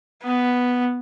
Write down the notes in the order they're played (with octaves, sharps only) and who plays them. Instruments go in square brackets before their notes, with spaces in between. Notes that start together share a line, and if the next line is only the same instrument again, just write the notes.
[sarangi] B3